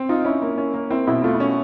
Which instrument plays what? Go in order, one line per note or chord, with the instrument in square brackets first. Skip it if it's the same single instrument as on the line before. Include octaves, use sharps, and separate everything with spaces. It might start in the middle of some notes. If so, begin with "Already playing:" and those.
Already playing: [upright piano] C4
[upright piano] D#4 [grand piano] F4
[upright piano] C#4 [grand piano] E4
[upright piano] A#3
C#4
A#3
[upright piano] C4 [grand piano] E4
[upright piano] B2 [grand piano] E4
[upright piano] A3 [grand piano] F4
[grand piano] E4
[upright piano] C#4